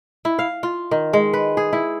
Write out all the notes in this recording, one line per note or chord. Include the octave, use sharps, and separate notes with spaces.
E4
F5
F4
D#3
G#3
B4
G#4
E4